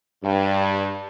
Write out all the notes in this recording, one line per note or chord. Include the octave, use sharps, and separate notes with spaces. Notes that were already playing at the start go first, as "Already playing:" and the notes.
G2